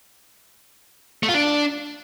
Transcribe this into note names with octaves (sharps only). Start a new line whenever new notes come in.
A3
F4
D4